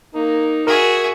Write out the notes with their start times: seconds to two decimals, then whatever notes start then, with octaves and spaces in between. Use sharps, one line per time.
0.15 A#3 D#4
0.67 F#4 G#4 A#4 E5